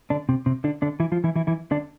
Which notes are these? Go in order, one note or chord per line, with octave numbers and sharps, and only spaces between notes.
D3 D4
C3 C4
C3 C4
D3 D4
D3 D4
E3 E4
F3 F4
E3 E4
E3 E4
E3 E4
D3 D4